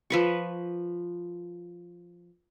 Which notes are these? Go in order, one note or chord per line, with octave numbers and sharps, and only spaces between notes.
F3 B4 C#6